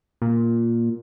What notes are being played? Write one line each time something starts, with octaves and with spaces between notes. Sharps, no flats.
A#2